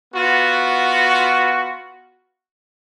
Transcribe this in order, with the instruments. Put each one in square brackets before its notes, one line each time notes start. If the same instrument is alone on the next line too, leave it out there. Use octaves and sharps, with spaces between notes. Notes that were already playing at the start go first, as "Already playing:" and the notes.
[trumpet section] B3 F4 F#4